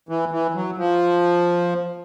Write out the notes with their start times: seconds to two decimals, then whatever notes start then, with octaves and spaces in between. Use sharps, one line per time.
0.09 E3
0.31 E3
0.55 F#3
0.77 F3